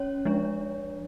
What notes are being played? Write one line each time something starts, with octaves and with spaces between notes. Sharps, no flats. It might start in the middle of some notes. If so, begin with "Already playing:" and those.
Already playing: C#4 C#5
F3 G#3 D4